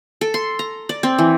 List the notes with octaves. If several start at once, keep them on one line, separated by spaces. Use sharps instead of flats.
A4
C6
A#5
D5
C4
E3